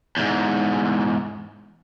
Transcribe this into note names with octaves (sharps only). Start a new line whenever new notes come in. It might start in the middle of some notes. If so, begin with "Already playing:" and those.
E2 G#2